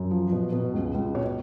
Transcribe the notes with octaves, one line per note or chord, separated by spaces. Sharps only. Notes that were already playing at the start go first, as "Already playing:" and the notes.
Already playing: F#2
F3
B2
B2
C#2
C#2
B2 C#5